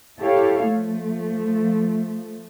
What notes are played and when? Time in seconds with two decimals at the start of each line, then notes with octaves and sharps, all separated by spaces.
0.18 E4 G4 A4 C#5 F5
0.66 F3 A3